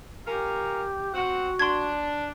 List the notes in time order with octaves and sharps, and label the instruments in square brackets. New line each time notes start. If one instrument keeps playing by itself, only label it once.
[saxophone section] C#4 F4 A#4 [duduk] G4
[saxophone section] C4 F#5 [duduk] F#4
[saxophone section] D4 [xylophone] C6 G#6